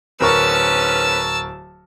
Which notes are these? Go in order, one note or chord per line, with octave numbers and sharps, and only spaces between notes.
D1 G#2 C#4 A#4 B4 A5 C#6 E6